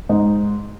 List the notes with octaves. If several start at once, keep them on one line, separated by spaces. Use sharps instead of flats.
G#2 D#4